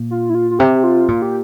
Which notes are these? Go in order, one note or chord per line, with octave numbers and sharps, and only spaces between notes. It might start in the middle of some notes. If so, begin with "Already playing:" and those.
Already playing: A#2
F4
E4
F4
F4
C3 G4
G4
F4
A#2 F4
G4